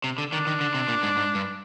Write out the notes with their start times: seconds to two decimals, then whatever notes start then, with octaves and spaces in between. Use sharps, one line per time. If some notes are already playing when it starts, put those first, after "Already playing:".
0.04 C3
0.18 D3
0.32 D#3 D4
0.47 D#3
0.61 D3
0.74 C3
0.88 A#2
1.03 G#2
1.17 G#2
1.35 G2